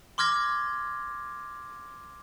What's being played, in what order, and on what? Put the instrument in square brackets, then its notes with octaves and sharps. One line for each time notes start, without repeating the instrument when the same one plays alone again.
[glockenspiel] C6 D6 F6 G#6 A#6